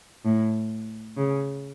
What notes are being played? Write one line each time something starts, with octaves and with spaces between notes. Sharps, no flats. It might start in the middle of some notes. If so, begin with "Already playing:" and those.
A2
C#3